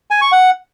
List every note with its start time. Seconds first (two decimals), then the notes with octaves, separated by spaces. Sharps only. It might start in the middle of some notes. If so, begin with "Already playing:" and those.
0.11 G#5
0.21 C#6
0.32 F#5